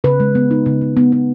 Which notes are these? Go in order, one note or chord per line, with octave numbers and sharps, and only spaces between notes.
C#3 B4
G#3
B3
D#4
C#3
C#3
B3
B3